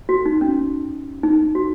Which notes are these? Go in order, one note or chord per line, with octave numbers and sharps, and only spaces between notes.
F#4
D#4
C#4
D#4
F#4